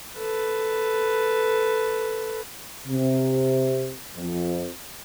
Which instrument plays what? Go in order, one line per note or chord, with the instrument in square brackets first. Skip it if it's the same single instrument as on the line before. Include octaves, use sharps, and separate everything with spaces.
[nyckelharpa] A4 B4
[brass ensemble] C3
F2